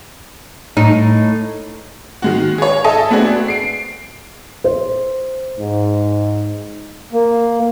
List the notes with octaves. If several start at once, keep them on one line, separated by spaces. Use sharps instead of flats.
A2 D#4
D#3 G#3 F#4
G#4 C#5
A4 D#5 E5 G#5 A5
A3 B3 C4 D4 F#4 G#4
C7 D7
C5
G#2
A#3